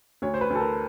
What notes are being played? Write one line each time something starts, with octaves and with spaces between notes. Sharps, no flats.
D2 C#5
C5
B4
D2 A4
A#4